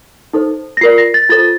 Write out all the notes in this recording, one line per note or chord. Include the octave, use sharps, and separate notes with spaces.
D#4 A4 C5
A#6
F4 A#4 D5 C7
A#6
A6
F4 A4 C5 A6